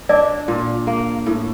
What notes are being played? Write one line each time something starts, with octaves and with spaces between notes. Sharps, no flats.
D4 D5
A#2
A#3
A2